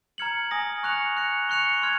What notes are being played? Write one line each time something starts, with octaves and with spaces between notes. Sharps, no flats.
A#5 F6 G#6 C#7 F#7
G#5 D#6 A#6
C#6 F#6 C#7 F7
F#6 A#6 C#7
C#6 F#6 C#7 F7
C6 F6 G#6